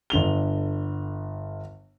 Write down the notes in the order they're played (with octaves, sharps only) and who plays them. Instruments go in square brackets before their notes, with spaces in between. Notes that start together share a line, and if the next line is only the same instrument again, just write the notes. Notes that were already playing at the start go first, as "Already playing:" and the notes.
[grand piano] G1 D3 F7 G7